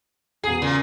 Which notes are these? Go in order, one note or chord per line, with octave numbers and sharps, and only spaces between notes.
E1 G#4 C7
A#2 C#3